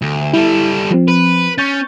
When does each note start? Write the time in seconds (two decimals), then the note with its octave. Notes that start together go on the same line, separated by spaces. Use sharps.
0.02 D2
0.33 G3 E4 A4
0.91 F3 C4
1.08 B4
1.58 C#4 C#6 G6 A6